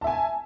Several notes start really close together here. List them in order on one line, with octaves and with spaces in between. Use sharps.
A5 E5 G#5